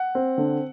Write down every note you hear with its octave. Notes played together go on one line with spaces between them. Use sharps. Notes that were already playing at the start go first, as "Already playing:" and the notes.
Already playing: F#5
C4
D3